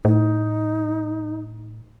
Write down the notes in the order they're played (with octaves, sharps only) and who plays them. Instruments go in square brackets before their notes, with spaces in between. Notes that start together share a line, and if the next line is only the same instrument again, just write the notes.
[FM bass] A2 [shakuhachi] D#4